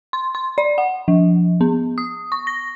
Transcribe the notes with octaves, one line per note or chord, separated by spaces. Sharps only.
C6
C6
D5
F#5
F3
B3
D#6
C#6
A#6